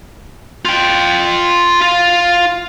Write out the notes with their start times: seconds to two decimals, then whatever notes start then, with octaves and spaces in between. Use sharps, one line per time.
0.65 F4 G5
1.81 F4